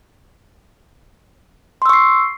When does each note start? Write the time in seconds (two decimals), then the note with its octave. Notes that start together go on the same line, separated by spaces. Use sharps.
1.82 C6
1.86 E6
1.89 C#6
1.93 C7